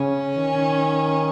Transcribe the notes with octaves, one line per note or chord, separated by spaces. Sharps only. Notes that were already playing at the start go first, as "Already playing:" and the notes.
Already playing: C#3 C#4
D#3